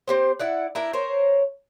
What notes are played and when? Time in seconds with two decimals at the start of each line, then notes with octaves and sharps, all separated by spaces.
0.07 C4 G4 C5
0.39 E4 D5 F#5
0.75 D4 E4 A#4
0.93 A#4 C5 C#5